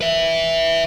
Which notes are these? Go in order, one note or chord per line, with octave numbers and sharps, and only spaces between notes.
B4 E5